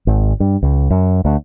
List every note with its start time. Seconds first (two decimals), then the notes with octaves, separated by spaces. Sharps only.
0.07 G#1
0.40 G2
0.62 C#2
0.90 F#2
1.25 D2